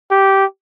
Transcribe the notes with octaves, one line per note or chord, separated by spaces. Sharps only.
G4